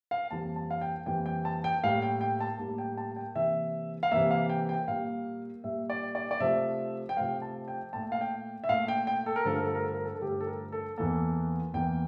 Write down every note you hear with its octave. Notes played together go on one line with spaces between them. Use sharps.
F5
F2 E3 G3 A#3 A5
A5
F5
G5
F2 E3 G3 A#3 G5
G5
A5
G5
A2 G3 A#3 F5
G5
G5
A5
A2 G3 A#3
G5
A5
G5
C3 E3 A#3 E5
F5
C3 E3 A#3 E5
F5
G5
G5
A#2 G3 A#3 F5
A#2 G3 A#3 E5
D5
D5
D5
C3 F3 A3 E5
G5
C3 F3 A3 F5
A5
G5
A#2 A3 A5
G5
F5
G5
E5
A#2 A3 F5
G5
G5
A4
A#4
G2 D3 F3 A3 A4
A#4
A4
A#4
A4
A#4
A4
A4
G2 D3 F3 A3 G4
A4
A#4
A4
E2 E3 A#3 A4
E2 E3 A#3 G5